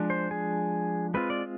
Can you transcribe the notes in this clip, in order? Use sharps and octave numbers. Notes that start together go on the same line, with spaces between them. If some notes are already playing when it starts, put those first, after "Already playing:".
Already playing: F3 G#3 D4
C5
G#4
G#3 C4 F4 B4
D5